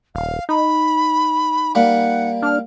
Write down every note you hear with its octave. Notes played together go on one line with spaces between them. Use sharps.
D#1 F5
D#4 B5
G3 A#3 F#5 B5
D4 F6